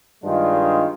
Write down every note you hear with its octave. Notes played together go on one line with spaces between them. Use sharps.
G2 D#3 G#3 D4 F4